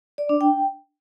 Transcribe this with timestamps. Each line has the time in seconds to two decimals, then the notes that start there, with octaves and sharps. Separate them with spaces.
0.18 D5
0.29 D4
0.41 G5